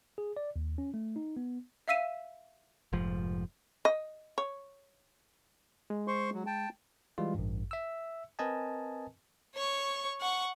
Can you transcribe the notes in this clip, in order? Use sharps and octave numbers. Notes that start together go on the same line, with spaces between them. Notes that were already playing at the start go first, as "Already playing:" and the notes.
G#4
D5
D#2
C#4
A3
D#4
B3
E5 F5 E6 B6 D#7 E7
F1 G#2 F3
D#5
C#5
G#3
C5 C6 C#6
F#3
G5 A5
E3 G3 G#3 F4
A1 G2
E5 E6
C4 A#4 B4 D#5 G#5 A5
C#5 C#6
F#5 C#6